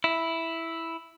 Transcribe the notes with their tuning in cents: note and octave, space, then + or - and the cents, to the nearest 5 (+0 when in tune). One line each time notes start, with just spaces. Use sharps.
E4 +0